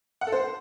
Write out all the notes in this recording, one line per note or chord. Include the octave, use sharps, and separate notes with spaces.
F#5
A4
C5